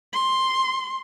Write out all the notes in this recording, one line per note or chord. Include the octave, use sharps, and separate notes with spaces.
C6